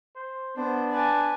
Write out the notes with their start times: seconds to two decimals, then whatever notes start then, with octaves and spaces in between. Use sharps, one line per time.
0.15 C5
0.57 B3 D4 C5
0.92 B4 D5 G#5 A5